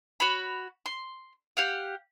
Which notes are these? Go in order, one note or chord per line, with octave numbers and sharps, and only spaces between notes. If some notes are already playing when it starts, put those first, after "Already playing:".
F#4 C#5 B5
C6
G4 F5 F#5